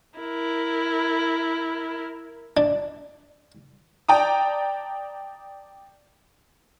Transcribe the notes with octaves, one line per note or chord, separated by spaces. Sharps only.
E4 A#4
D4
D5 G5 A5 A#5 D#6